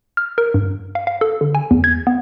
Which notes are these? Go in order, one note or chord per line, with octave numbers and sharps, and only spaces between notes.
F6
A#4
G2
F5
F5
A4
D3
G#5
E2
G#6
B3